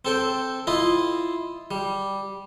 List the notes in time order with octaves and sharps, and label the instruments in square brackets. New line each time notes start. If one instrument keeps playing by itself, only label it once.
[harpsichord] C4 A4 G5
E4 F4 D#5
G3